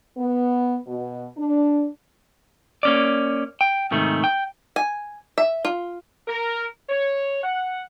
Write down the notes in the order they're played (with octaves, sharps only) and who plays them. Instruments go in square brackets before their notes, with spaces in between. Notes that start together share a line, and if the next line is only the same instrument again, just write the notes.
[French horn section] B3
B2
D4
[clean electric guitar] A#3 C#4 D5
G5
G#2 C3 D#3 A3
G5
[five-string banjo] G#5
E5
F4
[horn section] A#4
C#5
F#5